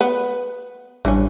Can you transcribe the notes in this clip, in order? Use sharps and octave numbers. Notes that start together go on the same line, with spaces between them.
B3
A1 E3 G3 C#4 D4